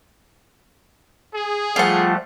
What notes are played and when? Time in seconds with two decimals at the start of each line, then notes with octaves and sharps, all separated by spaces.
1.34 G#4
1.76 F3 G3 A3 F4 F#5